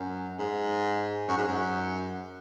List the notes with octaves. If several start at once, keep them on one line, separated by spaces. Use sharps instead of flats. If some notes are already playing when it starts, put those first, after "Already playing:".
Already playing: F#2
G#2
F#2
G#2
F#2